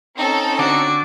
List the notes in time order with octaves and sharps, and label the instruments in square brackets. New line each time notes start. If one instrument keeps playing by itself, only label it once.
[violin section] C4 C#4 A4 [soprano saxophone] D#4
[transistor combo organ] D3 D6 [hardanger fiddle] F#4